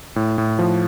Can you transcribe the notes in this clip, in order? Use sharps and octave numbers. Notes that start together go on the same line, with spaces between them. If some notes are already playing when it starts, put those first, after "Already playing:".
A2
A2
F3